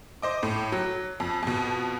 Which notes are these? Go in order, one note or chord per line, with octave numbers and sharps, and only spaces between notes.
C5 D#5 D6
A2
F#3
F2
F2 B2